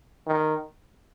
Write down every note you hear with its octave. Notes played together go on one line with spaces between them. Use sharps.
D#3